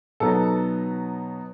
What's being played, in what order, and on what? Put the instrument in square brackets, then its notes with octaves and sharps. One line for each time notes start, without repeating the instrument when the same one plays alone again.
[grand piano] B2 F#3 B3 D#4 A4